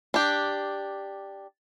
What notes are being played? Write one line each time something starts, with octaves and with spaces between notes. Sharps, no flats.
D4 G4